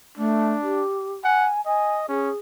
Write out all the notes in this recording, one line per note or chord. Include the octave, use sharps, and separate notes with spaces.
A3 D4
G4
F#5 G#5
D#5 G#5
C#4 G#4